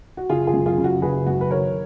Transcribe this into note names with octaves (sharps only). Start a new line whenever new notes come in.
F#4
F#1 F4 G#4
F4 G#4
F#2
F4 G#4
C#3
F#4
F#1 G#4 B4
F#2 F#4
B4
D#3 A#4 C#5